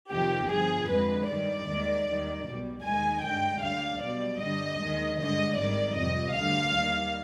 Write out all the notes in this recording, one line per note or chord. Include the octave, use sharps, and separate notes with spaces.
F2 C3 D#3 G4
G1 G2 F3 G#4
F2 D3 G#3 B4
G2 D#3 G3 D5
D#2 D#3 G#3
D#2 D#3 G3
B1 B2 G3
D#2 D#3 G#3 G#5
G2 D3 G#3 G5
D2 D3 G3 F5
B1 B2 G3 D5
G2 D3 G3 D#5
D#2 D#3 G#3
G2 D3 G#3 D#5
G#1 G#2 D#3 G3 D5
F2 C3 G3 D#5
D2 D3 G3 F5
D#2 D#3 G3